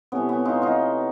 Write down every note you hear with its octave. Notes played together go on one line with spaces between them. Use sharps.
C3 E3 A3 B3 C#4
B3
D#4 F4
D#4 F4